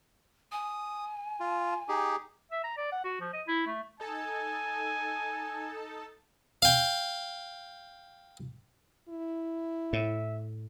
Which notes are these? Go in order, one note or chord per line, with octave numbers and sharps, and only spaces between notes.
G#5 D#6
F4
D#4 G4 G#4
E5
A#5
D5
F#5
F#4
F3
D#5
E4
A3
D#4 A4 G#5 A5
F5 G5
E4
A2 E5